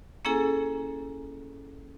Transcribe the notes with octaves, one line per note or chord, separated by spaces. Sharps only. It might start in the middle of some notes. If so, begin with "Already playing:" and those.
A#3 C#4 E4 G#4 A4 G#5